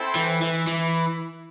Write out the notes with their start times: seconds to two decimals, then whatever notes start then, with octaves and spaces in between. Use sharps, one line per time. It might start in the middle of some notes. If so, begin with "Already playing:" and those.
Already playing: C4 E4 A4 C5 G5
0.15 E3
0.42 E3
0.67 E3